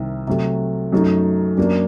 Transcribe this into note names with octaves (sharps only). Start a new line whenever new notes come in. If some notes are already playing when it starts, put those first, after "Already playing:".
Already playing: C2 C3 D#3
C3 F#3 A3
F#2 F#3 A3 D#4
F#2 F#3 A#3 D4